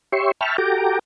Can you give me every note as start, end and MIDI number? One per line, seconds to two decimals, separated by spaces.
0.12 0.31 67
0.12 0.31 73
0.12 0.31 76
0.12 0.31 84
0.12 0.31 85
0.41 0.57 76
0.41 0.57 79
0.41 0.57 81
0.41 0.57 83
0.41 0.57 85
0.41 0.57 89
0.58 0.99 66
0.58 0.99 67
0.58 0.99 69
0.58 0.99 79
0.58 0.99 82
0.58 0.99 86